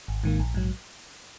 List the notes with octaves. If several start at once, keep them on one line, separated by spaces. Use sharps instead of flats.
G#1
G#2 D#3 A#3
A#1
G#2 F#3